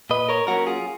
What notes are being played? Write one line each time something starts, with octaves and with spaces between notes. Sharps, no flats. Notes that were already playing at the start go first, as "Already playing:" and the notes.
A#2 B4 D#5
A#4 C#5
F#3 A#3 C#4 F#4 A#4
F4 G#4